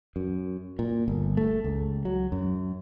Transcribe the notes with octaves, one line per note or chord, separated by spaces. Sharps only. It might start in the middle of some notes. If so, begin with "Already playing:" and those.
F#2
A#2
G1
A3
C#2
F#3
F#2